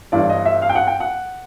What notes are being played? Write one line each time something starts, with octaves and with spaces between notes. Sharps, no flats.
G1 G2 E3 D5
D#5
E5
F5
G5
F#5
G5
F#5